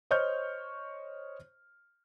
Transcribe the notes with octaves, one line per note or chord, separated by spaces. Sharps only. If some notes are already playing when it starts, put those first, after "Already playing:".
C5 C#5 D#5 C#6 F6 G6